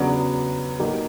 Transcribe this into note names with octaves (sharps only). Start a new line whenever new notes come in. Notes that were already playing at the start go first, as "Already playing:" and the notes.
Already playing: E2 C#3 F#3 B3 D4
F#3 A#3 D#4 G4